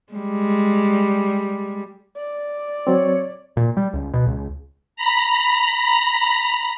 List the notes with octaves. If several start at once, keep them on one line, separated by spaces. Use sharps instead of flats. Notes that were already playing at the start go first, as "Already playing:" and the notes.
G3 G#3
D5
F#3 C4 C#5
A#2
G3
C#2
B2
C#2
A#5 B5